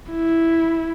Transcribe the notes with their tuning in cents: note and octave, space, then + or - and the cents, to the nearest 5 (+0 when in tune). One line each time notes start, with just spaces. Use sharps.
E4 -5